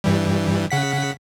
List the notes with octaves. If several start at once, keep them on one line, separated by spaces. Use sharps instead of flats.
G2 E3 G3
C#3 F#5 B6